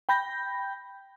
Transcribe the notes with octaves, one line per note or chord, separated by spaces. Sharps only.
G5 B5 G6 A#6